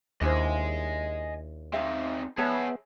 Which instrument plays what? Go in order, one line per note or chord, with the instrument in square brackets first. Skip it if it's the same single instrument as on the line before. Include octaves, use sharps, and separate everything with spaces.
[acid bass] D#2 [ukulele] D4 E4 C5 [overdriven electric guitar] D#5 G#5
[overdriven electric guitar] C4 D#4 [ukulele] E5 F5
[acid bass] B3 [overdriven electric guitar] G#4 E5 [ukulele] C#5 A5